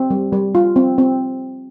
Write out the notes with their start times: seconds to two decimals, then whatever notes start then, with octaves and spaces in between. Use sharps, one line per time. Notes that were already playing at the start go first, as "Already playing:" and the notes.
Already playing: C4
0.10 G3
0.33 G3
0.55 F4
0.76 C4
0.98 C4